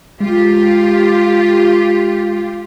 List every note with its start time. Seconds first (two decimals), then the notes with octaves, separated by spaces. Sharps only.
0.21 G#3 F4 G4